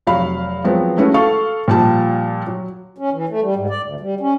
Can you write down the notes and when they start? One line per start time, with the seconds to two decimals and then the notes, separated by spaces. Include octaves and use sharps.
0.07 F1 F#3 F5 B5
0.64 F3 F#3 G#3 B3 C4
0.97 G#3 A3 C#4 E4 F#4 B4
1.14 A4 F5 C#6
1.68 A#2 F3 G3 G5 A5
2.47 F#3
2.98 C#4
3.13 E3
3.29 A3
3.42 G3
3.56 G#2
3.70 D5
3.82 D2
4.00 G3
4.20 C#4